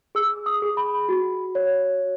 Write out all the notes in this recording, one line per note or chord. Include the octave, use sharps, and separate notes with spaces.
G#4 E6
D#6
G#4
B5
F#4
C#5